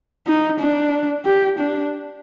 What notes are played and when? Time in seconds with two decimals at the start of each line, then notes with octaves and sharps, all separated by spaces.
0.27 D#4
0.60 D4
1.25 G4
1.59 D4